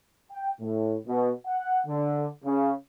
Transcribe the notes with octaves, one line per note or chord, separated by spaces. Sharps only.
G5
A2
B2
F#5
D3
C#3